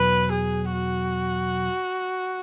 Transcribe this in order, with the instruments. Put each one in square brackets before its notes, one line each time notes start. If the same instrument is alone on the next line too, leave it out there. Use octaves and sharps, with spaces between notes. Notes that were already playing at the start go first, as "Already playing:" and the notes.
Already playing: [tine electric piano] E2 B2 F#3 [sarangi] B4
[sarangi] G#4
F#4